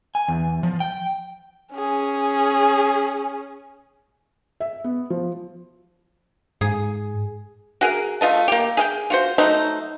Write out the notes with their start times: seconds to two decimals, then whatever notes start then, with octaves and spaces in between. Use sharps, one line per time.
0.15 G#5
0.28 E2
0.63 F3
0.80 G5
1.74 C#4 G#4
4.60 E5
4.84 B3
5.10 F3
6.61 G#2 G#4
7.81 F#4 G#4 A#4
8.21 A3 F4 D#5 A5
8.48 A#3 G4
8.77 G#4 F5 G5
9.10 F4 F#4 C5
9.38 F#3 A3 D#4 C5